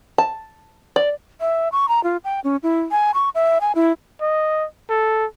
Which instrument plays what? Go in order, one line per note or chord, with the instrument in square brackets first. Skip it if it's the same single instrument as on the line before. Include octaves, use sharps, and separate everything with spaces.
[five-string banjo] A5
D5
[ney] E5
C#6
A#5
F4
G5
C#4
E4
G#5
C#6
E5
G#5
E4
[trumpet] D#5
A4